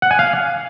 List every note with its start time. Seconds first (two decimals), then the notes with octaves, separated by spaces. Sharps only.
0.02 F#5
0.11 G#5
0.19 F5